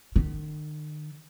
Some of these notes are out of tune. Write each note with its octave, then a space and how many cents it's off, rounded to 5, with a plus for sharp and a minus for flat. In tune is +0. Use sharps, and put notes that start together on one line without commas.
D#3 -45